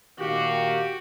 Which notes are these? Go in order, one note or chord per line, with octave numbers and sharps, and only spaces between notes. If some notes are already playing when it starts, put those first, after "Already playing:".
A#2 D#3 F#4 G4 F5